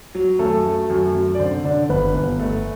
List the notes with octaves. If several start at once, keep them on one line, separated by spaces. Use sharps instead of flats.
F#3
F#2 A3 A4
F#3
F#2
F#2
D5
D3 C4 C5
D3 D4 D5
G1 B3 B4
G1
A3